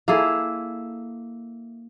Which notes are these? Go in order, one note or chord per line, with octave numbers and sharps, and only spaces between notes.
A#3 E4 G#4 A4